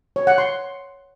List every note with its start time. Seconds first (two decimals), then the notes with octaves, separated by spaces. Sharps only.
0.16 C#5
0.27 F#5
0.38 C6